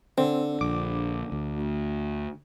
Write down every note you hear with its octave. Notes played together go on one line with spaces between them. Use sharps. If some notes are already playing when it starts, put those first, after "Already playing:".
D3 C4
A#1 D6
D2